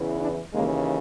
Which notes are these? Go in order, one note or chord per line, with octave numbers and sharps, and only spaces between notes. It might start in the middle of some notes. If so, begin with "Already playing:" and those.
Already playing: E2 C#3 E3
D4 E4
D#2 C#3 E3 G#3 A#3